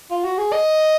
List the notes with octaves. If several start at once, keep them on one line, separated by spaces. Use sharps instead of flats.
F4
F#4
G#4
D#5